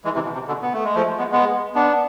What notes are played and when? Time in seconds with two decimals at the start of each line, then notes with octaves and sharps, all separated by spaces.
0.04 E3 G#3
0.15 C3 E3
0.24 B2
0.34 C3
0.47 B2 D3
0.62 B3
0.73 A3
0.84 G#3
0.95 F3 A3
1.18 G#3 B3
1.32 G#3 B3
1.75 B3 D4